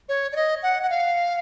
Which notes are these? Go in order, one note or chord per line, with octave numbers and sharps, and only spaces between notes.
C#5
D5
D#5
F#5
F#5
F5